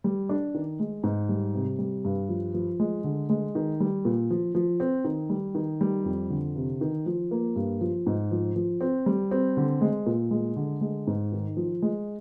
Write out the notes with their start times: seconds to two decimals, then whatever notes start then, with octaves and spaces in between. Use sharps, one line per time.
0.04 G3
0.29 D4
0.54 D#3
0.79 G#3
1.03 G#2
1.29 G3
1.55 C3
1.79 G3
2.05 G2
2.29 F3
2.54 F3
2.80 G#3
3.04 D3
3.29 G#3
3.55 D#3
3.80 G3
4.05 A#2
4.30 F3
4.55 F3
4.80 C4
5.04 D#3
5.30 G3
5.55 D#3
5.81 G3
6.05 F2
6.30 D3
6.56 C3
6.81 D#3
7.06 F3
7.31 A#3
7.56 G2
7.81 F3
8.06 G#2
8.31 F3
8.56 F3
8.81 C4
9.06 G3
9.31 C4
9.57 D3
9.81 G#3
10.06 A#2
10.31 G#3
10.56 D3
10.81 G#3
11.07 G#2
11.32 D#3
11.57 F3
11.82 G#3